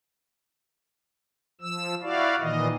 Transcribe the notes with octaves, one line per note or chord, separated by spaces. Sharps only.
F3 E6
E4 F#4 D5 F5
A#2 D#3 E3 D#5